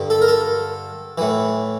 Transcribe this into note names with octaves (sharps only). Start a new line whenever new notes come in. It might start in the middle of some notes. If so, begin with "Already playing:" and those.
Already playing: G2 D3
A4
A#4
A4
A2 E3